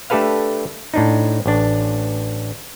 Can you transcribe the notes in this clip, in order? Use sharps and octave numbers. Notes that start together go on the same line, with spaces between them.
A3 D4 G4 A4 B4 F5
A2 D4 D#4
A1 D4